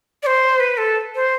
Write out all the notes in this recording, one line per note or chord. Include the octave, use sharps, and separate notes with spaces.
D5
C5
B4
A4
C5